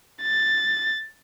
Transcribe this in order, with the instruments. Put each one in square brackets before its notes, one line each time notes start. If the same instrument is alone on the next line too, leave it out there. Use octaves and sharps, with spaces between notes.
[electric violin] A6